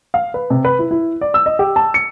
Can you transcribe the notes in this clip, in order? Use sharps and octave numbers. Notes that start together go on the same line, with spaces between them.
F5
B4
C3
B4
E4
E4
D5
E6
D#5
G4
A5
C#7